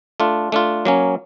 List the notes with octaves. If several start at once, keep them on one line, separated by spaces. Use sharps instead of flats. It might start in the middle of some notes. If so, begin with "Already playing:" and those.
A3 D4 F4
A3 D4 F4
F#3 A#3 C#4